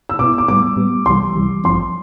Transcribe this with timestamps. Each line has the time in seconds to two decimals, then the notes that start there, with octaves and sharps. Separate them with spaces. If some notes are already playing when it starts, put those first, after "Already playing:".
0.09 E6
0.19 B2 B3 E4 D6
0.38 D6
0.48 A2 G3 B3 D6
0.76 A2 G3 B3
1.06 C2 C3 E3 G3 C6
1.35 C2 C3 E3 G3
1.64 A1 G2 F3 C4 C6